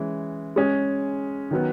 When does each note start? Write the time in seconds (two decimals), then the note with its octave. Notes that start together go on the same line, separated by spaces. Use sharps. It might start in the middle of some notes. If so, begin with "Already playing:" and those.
Already playing: E3 G#3 C#4
0.56 G#3 C#4 G#4
1.51 D#3 F#3 B3